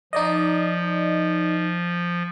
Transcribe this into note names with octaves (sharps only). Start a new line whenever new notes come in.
F3 D#4 D5 D#5